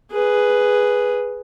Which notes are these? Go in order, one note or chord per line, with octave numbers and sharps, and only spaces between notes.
G#4 B4